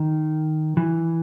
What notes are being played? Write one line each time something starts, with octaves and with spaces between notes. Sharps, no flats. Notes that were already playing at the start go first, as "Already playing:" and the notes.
Already playing: D#3
E3